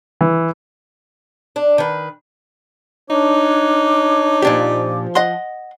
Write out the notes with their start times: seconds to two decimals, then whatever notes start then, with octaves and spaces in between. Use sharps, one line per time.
0.21 E3
1.56 D4
1.78 D#3 B4
3.10 D4 D#4 C#5 D6
4.42 A#2 F3 D4 G4
5.15 D#5 F#5 C6